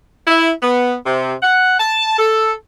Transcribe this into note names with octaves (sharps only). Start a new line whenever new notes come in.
E4
B3
C3
F#5
A5
A4